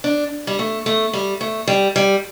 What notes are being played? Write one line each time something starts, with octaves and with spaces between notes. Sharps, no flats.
D4
G3
A3
A3
G3
A3
G3
G3